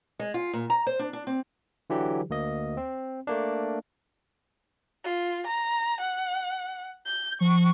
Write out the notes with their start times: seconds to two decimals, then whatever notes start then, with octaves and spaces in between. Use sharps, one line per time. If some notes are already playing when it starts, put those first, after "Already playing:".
0.19 G#3
0.34 F4
0.53 A#2
0.70 A#5
0.87 C5
0.99 D4
1.13 D4
1.27 C4
1.90 D3 E3 F#3 G4
2.30 D2 A#3 D#5
2.77 C4
3.27 A3 A#3 D4
5.04 F4
5.46 A#5
6.00 F#5
7.06 G6
7.41 F3 C#6